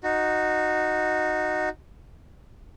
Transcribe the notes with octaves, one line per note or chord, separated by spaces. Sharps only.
D#4 F#4